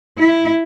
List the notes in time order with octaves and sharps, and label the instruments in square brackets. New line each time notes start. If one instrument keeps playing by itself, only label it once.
[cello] E4